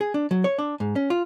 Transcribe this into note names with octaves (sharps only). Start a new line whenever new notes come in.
G#4
D4
F#3
C#5
D4
G#2
C#4
F4